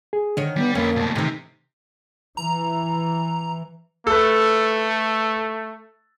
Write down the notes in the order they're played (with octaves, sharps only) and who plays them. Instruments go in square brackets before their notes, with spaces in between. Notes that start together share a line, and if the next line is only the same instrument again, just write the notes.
[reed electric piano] G#4
[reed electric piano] D3 [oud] D#3 C#5
[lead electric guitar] G3 [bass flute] B3
[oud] F2 [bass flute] A#3 [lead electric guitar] C#4 B4
[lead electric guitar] B2 A3
[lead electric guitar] C3 [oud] D#3 E3 [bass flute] A3
[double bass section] E3 [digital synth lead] A#5
[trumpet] A3 [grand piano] A4 B4